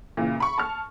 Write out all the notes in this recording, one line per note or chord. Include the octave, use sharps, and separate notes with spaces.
A#2 C#3 E3
B5 C#6
A5 C#6 F6